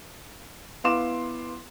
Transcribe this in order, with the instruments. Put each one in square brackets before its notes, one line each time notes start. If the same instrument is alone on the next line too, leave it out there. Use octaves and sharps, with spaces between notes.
[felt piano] B3 E4 F5 C6 D6 E7